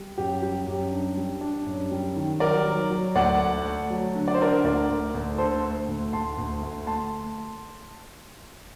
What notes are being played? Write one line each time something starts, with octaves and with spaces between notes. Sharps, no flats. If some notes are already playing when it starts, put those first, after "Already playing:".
Already playing: G3
F#2 G4
G3 G4
F#2 G4
D4
G3
D4
F#2
G3
D#3
F#3 A#4 D5
F#3
F#3
D2 D5 F#5
A3
A3
F#3
D3
D5
C5
D3 A#4 D5
D2 A#4 D5
D2
D2
D3 A4 C5
A3
D2
D2 A5 C6
D2
A3
A3 A5 C6